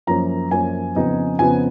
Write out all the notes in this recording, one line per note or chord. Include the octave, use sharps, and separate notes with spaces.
F#2 F3 A#3 C#4 A#5
F#2 F3 A#3 C#4 G#5
F2 C#3 F3 B3 D#4
F2 C#3 F3 B3 D#4 G#5